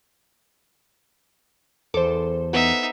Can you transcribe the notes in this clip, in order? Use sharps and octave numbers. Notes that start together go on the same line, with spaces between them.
E2 A4 C5 D6
B3 D#4 B4 E5